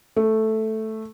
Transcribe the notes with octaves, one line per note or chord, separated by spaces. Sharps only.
A3